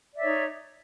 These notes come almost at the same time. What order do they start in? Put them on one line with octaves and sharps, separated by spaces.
D5 E5 C#5 D#4